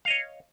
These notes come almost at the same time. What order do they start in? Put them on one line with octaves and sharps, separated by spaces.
F5 D#5 C#5